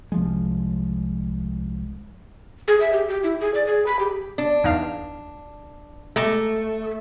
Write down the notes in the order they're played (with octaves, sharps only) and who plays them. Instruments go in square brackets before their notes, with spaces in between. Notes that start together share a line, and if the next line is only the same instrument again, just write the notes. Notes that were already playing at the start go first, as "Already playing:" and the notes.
[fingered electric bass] C2 F3 G#3
[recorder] G#4
E5
G4
G4
E4
G#4
D5
G#4
B5
G4
[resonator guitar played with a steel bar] D4
[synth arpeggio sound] E2 D#4 F5
[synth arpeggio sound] G#3 A#5 D6 [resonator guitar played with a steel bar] A3